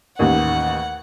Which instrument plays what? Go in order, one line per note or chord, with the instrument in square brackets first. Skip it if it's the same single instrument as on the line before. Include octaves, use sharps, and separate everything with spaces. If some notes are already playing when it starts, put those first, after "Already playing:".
[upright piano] A1 D#2 [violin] F#5